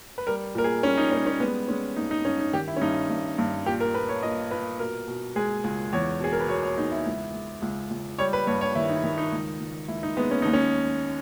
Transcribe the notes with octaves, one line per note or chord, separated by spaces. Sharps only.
B4
G3 A#4
A#2 A#4
G#4
G3 C#4
D#4
G3 C#4
C#4
G#3 B3
G#3 C#4
G2 D#4
D#4
G2 C#4
D#4
D#3 G4
E4
C#4
G2 D#4
G2
G2
A#2 G4
A#4
A#2 B4
C#5
A#2 D#5
A#2 B4
B2 A#4
B2
G#3 G#4
C#2
E2 C#5
B2 G#4
A#4
B4
B2 C#5
C#5
E2 D#4
E4
C#2
G#3
C#2
C#2
G3 C#5
B4
G2 C#5
C#5
D#3 E4
D#4
D#3
D#4
C#2
C#2
C#2 E4
D#4
G#3 B3
C#4
D#2 D#4
C#4